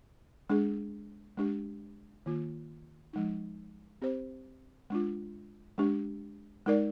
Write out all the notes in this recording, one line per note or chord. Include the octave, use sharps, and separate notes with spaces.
G#3 D4 G#4
G#3 D4 G4
D#3 A#3 F4
F3 G#3 D#4
C4 G4 C5
G#3 D4 F4
G#3 D4 G4
G#3 D#4 A#4 D5